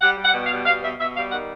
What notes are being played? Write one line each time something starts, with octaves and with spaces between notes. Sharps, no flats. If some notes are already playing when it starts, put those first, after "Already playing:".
G3 F#5
G3
F#5
B2
F5
G3
B2 F5
B2 E5
B2 E5
G3 F5
D#3 F#5